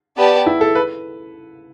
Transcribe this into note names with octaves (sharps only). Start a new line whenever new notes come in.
B3 G4 D5 A5
E4
A4
B4